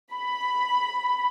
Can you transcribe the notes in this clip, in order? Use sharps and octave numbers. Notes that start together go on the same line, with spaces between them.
B5